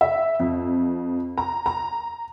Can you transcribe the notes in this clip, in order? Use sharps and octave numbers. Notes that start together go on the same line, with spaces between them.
E5
F2
A#5
A#5